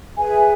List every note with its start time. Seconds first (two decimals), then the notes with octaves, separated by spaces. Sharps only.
0.17 G#4 B4 E5 G#5